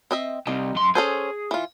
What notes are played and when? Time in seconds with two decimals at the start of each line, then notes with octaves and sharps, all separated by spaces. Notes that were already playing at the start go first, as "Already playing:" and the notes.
0.11 C4 D#5 E5
0.47 C2 C3 D#4
0.75 F#2 C6
0.95 C#4 G#4 A4 C5
1.51 E3 F4